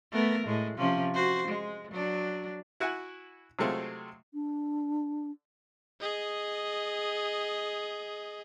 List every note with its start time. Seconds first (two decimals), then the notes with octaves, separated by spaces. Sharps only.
0.12 A3 B3 A#4
0.47 A2 G#3
0.78 C3 F3 C#4
1.15 F#4 C5
1.48 G#3
1.91 F#3 D4
2.80 E4 F#4 F#5 G#5
3.59 C3 F#3 G#3 A3 C4 F4
4.34 D4
6.01 G#4 D#5